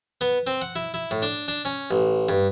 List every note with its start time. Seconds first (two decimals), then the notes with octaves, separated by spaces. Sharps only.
0.21 B3
0.47 C4
0.61 F#5
0.76 E4
0.94 E4
1.11 A2
1.22 D4
1.48 D4
1.65 C#4
1.91 A1
2.29 G2